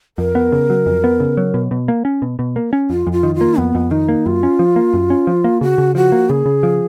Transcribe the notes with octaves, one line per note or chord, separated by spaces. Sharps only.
F2 A#4
B3
C#3
F#3
F2
B3
C#3
F#3
B2
B2
A#3
C#4
B2
B2
A#3
C#4
F2 F4
F2
F4
D#3
F4
A#3
F2 B3
F2
D#3 D#4
A#3
F#2 F4
C#4
F3
A#3
F#2
C#4
F3
A#3
C#3 F#4
C#3
F3 F#4
A#3
C#3 G#4
C#3
F3